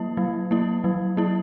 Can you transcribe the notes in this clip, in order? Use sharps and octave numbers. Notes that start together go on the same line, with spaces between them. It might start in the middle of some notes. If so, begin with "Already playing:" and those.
Already playing: F#3 A#3 E4
F#3
A#3 E4
F#3
A#3 E4